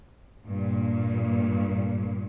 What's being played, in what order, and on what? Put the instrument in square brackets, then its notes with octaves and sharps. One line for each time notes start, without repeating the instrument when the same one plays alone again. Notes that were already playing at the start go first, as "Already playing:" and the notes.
[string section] G2 A#2